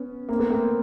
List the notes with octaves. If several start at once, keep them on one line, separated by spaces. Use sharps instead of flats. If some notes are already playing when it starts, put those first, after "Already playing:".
Already playing: B3 C#4
A#3 C4
A3 B3
A#3 C4